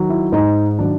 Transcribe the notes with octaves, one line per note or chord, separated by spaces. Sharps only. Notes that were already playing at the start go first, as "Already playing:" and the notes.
Already playing: D#3 F#3
E4
G#2 D#4
D#3 F#3 D4